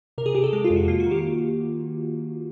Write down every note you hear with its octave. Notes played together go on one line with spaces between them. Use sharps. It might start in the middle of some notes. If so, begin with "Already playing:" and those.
C3 A#4
G#4
C3 G4
A4
G#3 G4
F4
F2
F#4
A#3 F4
F#4
D#3
G4